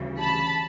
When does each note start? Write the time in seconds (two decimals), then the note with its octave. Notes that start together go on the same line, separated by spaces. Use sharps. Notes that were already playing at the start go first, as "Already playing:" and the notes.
Already playing: D2 C#3 E3 G3
0.20 A5 B5